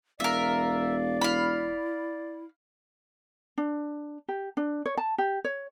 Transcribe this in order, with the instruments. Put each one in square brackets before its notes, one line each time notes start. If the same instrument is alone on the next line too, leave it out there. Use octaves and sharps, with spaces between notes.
[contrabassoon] E1 [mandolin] A#4 E5 [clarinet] D5 [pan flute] F5
[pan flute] E4 [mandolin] F5 B5
[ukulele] D4
G4
D4
C#5
A5
G4
C#5